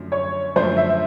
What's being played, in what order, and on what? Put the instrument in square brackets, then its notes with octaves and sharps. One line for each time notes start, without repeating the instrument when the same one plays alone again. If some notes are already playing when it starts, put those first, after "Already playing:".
Already playing: [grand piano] F#2 D3 F3 A3
[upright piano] C#5
[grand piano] F#2 D3 F3 A3 [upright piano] C5
[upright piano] E5